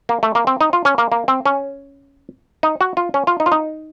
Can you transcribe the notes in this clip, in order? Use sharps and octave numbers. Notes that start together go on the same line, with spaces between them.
A#3
A3
A#3
C4
D#4
F4
C#4
A#3
A#3
C4
C#4
D#4
F#4
F4
C#4
F4
D#4
F4
D#4